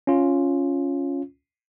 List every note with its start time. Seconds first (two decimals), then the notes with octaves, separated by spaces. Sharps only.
0.07 C#4 F4